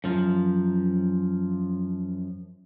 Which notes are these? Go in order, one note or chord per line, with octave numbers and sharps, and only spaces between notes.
F#2 F3